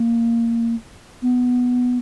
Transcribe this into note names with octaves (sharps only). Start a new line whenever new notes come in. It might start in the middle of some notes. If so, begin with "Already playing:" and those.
Already playing: A#3
B3